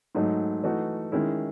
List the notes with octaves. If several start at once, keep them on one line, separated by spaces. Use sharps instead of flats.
G#2 F#3 A3 D#4
E3 A3 D#4 F#4
D#3 G#3 C#4 E4